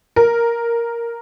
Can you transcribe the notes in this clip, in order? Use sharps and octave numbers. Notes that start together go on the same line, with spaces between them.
A#4